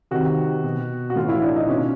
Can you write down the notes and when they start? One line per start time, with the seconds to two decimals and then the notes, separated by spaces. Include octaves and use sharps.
0.11 C3 D#3 F#4
0.64 B2
1.10 F#4
1.16 A2 E3 F4
1.29 E4
1.42 D4
1.56 D#4
1.68 B2 C#4